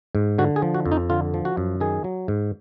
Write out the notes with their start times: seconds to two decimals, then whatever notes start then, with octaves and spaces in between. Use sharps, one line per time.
0.15 G#2
0.38 D3 F#4
0.56 G#4
0.62 F3
0.74 F#4
0.86 F2
0.92 D#4
1.10 D3 F4
1.34 F3
1.45 F#4
1.57 F#2
1.80 D#3 G#4
2.04 F#3
2.28 G#2